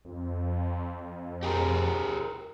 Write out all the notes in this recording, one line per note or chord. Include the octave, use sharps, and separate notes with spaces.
F2
G4 G#4 A#4